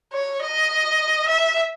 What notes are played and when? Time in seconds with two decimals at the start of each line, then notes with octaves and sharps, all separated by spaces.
0.13 C#5
0.42 D#5
1.28 E5